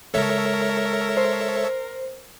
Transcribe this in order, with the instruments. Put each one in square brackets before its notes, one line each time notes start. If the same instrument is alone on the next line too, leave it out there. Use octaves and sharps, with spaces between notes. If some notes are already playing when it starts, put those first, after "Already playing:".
[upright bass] C#3 G#3 [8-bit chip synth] A4 C#5 E5 [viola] A#4
[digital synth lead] C5